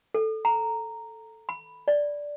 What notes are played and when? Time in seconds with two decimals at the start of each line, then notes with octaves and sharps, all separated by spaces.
0.15 A4
0.45 A#5
1.49 B5
1.88 D5